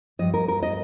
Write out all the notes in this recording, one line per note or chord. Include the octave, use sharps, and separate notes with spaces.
G2 F3 D#5
A#4
A#4
D#5